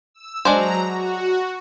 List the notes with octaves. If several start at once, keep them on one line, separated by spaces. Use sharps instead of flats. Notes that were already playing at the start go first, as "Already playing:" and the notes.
E6
F#3 G#3 D4 C5 A#5
F#4